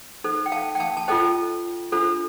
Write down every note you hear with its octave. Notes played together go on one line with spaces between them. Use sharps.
D#4 A4 C5
G5
F5 A5
G5
F5 A5
A5
F4 A4 C5 D#5 G5
D4 F4 A4 C5